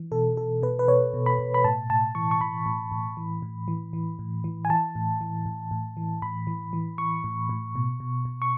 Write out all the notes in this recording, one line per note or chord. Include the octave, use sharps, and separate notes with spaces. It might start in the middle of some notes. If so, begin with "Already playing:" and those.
Already playing: E3
B2 A4
B2 A4
B2 B4
B4
B2 C#5
B2
B5
B2
B5
A2 A5
A2 A5
E3 C#6
C#6
E3 B5
A2
A2
E3
A2
E3
E3
A2
E3
G#5
E3 A5
A2
E3
A2
A2
E3
A2 B5
E3
E3
E3 C#6
A2
A2
B2
B2
B2
C#6